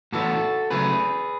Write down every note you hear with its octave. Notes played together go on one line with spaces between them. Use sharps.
A2 E3 B3 F#4 A4
C#3 F#3 A3 G#4 B4